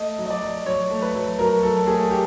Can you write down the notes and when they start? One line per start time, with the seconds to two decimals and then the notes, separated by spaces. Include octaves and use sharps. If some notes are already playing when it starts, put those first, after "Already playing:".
Already playing: A3 D#5
0.18 F#3
0.26 D#5
0.30 D5
0.42 F#3
0.66 F#3 C#5
0.91 A3
1.02 B4
1.14 F#3
1.38 F#3 A#4
1.63 F#3 A4
1.86 A3 G#4
2.11 G4